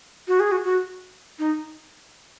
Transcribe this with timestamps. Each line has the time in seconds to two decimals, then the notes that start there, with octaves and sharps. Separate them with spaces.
0.28 F#4
0.40 G#4
0.52 F#4
0.64 F#4
1.39 D#4